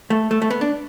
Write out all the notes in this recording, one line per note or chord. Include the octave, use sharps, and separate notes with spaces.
A3
A3
A3
B3
D4